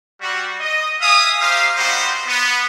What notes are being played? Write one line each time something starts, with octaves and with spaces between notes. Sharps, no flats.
G3 F#4
D#5
E5 F5 G#5 D#6
D#4 G4 C5 F5
G3 B3 C4 D#4 F#4 C5
B3